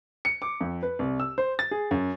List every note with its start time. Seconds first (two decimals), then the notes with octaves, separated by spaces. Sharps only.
0.25 C#7
0.42 D6
0.61 F2
0.83 B4
0.99 C2
1.20 E6
1.38 C5
1.59 A6
1.71 G#4
1.91 F#2